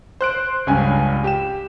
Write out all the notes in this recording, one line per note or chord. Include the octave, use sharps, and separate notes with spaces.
C5 F#6 D7
C#2 G2 C#4 G#5
G4 E7